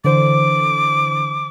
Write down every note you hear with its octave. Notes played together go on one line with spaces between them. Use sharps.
D3 E3 C5 D6